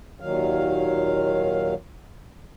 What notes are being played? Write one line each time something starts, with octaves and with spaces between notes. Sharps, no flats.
D#2 A#2 D#3 F#3 F5